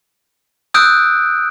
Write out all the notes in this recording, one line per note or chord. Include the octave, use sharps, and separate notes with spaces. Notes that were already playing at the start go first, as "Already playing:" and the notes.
D#6 E6 F#6 G6 D7